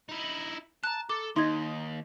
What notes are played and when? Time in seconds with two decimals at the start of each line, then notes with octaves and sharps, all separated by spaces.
0.09 D#4 E4
0.84 A5 A#5 F#6
1.09 A4 D6
1.36 D#2 D#4 C6 G#6